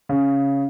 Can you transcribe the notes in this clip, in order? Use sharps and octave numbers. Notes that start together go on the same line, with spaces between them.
C#3